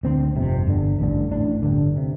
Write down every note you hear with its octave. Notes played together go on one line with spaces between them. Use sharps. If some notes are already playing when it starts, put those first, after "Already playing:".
D2 D3 C4
G1 F2 C3
G1 G2 D3
A1 G2 D3
A1 A2 D4
G1 G2 D3
C3